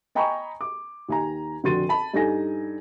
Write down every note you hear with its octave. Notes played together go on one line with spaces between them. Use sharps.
D#5 G5 G#5 A#5 B5 C#6
D6
D#2 G#5 A#5
F1 D3 F#4 C6 A6 D#7
A5 B5
G2 D#4 A4 G#5 A#6